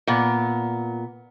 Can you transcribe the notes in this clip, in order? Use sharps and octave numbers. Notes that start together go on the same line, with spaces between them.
A#2 B3